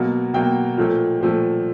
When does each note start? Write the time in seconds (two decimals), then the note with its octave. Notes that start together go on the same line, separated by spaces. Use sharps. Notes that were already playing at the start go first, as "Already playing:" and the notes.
Already playing: B2 F#3 A#3
0.34 B2 F#3 A#3 G5
0.78 A#2 F3 A3
1.21 A#2 F3 A3